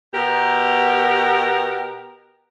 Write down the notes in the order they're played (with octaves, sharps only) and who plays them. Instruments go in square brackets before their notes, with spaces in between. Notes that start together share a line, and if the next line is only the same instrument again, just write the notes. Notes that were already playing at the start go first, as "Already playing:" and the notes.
[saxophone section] B2 B3 G4 A#4